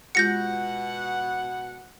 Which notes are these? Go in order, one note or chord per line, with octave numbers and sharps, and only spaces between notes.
B2 G#3 F4 G4 F#5 G6 A#6 C#7